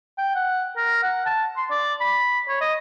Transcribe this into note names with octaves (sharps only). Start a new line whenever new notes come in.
G5
F#5
A#4
F#5
A5
C6
D5
B5
C#5
D#5